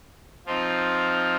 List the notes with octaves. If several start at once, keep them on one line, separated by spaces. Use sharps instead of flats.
F3 C4 D#4 F4